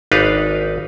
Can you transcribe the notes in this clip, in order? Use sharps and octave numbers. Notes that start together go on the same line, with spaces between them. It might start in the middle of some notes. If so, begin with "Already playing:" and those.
G#1 D4 D#4 B4 F5